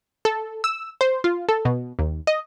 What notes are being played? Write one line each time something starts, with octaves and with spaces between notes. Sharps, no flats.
A4
E6
C5
F4
A4
B2
D#2
D#5